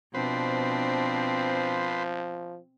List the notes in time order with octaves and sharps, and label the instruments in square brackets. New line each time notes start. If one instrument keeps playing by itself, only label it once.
[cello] B2 D4 [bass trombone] F3 [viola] C4 [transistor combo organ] B4 C5